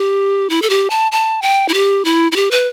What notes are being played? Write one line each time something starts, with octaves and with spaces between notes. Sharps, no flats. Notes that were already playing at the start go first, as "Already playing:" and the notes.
Already playing: G4
E4
A4
G4
A5
A5
G5
E4
G4
E4
E4
G4
B4